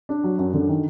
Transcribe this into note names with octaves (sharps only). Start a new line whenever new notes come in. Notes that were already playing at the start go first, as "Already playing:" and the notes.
D4
F#3
F#2
D3
D#3